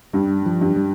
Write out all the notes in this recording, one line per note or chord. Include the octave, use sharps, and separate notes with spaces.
G2 G3
F3
G2
G3